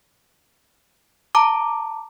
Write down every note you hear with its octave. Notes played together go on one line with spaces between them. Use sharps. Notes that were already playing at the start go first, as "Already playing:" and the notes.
A5 A#5 D6